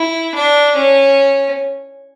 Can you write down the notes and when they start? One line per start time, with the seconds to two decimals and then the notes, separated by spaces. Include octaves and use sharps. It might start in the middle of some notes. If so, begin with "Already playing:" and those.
Already playing: E4
0.35 D4
0.75 C#4